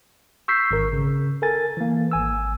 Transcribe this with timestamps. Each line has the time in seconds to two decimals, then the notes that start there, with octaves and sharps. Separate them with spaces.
0.48 C#6 E6 G6 B6 C7
0.71 G#1 A#4
0.93 C#3
1.42 A4 A#4 G#5 A6
1.77 E3 A#3
2.11 G#1 G#5 E6